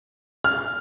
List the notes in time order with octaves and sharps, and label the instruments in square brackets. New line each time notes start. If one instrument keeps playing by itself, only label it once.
[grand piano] F6